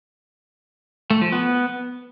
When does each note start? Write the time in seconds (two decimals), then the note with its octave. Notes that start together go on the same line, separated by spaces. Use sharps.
1.10 A3
1.22 F3
1.33 B3